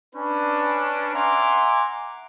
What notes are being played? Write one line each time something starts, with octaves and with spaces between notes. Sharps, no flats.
C#4 D4 B4
E5 F#5 G#5 A#5 C6 D6